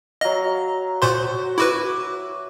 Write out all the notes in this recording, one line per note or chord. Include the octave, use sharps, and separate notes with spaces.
F#3 D#5 F5
A#2 F#4 C5 C6
E4 F#4 B4 E5 D6